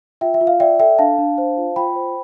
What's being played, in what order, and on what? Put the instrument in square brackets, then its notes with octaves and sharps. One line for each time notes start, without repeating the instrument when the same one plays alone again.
[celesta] F4 E5 G5
E5
F4
F5
D5 E5 G5
A4 E5 G5
D4 F5 A5
D4
C5
F4
F4 G5 B5
C5